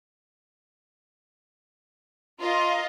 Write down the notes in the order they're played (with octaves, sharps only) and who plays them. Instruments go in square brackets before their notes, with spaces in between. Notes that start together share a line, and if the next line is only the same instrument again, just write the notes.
[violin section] F4 [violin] A#4 D#5